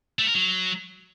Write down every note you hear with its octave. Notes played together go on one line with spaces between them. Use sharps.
A3
A#4
F#3